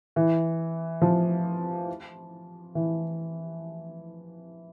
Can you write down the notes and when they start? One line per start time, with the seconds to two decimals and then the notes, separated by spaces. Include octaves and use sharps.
0.16 E3
1.01 F3
2.75 E3